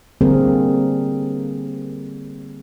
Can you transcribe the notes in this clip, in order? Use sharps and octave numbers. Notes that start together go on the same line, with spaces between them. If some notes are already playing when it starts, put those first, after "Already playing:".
D3 G3 A#3 C4 G#4 A#4